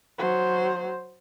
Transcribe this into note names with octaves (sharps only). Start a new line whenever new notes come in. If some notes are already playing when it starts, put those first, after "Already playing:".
F#3 C5